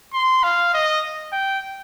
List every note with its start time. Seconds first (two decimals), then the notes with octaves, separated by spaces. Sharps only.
0.14 C6
0.43 F5
0.74 D#5
1.33 G5